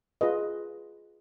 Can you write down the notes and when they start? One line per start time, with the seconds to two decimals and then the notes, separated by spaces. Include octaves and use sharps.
0.21 F4 G#4 B4 D#5